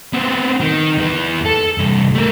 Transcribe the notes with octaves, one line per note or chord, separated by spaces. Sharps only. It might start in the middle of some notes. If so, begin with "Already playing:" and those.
B3 C4
D#3
E2 B3
A4
C2 G2
A3 A#4